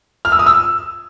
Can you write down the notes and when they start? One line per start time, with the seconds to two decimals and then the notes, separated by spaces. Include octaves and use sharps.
0.25 F6
0.32 E6
0.39 D#6
0.46 E6